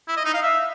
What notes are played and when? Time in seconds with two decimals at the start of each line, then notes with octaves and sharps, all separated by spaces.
0.08 E4
0.17 D#5
0.25 D#4
0.34 F5
0.42 E5